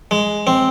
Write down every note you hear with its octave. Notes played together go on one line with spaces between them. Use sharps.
G#3
C4